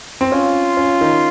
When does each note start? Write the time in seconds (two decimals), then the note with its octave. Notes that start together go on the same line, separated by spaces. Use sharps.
0.21 C4
0.32 C#4 F4
0.77 C#4
1.01 D#3